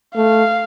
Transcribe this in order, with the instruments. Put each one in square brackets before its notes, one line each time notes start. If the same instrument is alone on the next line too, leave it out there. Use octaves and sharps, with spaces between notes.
[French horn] A3 [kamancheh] F5